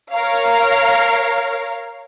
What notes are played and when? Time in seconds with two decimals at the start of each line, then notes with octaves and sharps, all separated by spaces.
0.12 A#4 C#5 F5